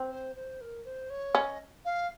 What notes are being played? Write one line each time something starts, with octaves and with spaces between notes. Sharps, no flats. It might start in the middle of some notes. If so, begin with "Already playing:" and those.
Already playing: C4
C5
C5
A#4
C5
C#5
C#4 D#5
F5